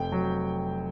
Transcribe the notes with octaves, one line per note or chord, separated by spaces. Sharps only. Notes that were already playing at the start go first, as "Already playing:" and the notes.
Already playing: F1 G5
F#3